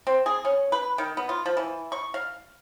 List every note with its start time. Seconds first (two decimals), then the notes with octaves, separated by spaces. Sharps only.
0.07 C4
0.26 G#4
0.45 C#4
0.72 B4
0.98 D#3
1.17 B3
1.29 F4
1.46 F3
1.57 E3
1.92 C#6
2.14 F5